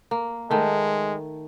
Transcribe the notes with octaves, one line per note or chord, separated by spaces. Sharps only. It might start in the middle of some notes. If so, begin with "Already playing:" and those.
A#3
D#3 G#3 A3